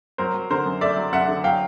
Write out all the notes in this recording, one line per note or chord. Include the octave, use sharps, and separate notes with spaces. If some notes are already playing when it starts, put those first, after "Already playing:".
F#3 A#4 C5
F#3
D3 A#4 C5
F#2
A3 D5 E5
F#3
F#2 E5 F#5
D3
F#3 F5 G5